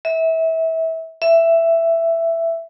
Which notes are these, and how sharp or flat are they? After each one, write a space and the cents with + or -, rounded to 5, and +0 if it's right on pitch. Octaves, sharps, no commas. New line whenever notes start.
E5 -25
E5 +10